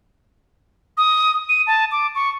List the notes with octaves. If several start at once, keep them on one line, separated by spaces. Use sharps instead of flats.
D#6
D#7
A5
D6
C#6